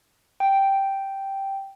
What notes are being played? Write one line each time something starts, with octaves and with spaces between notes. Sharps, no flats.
G5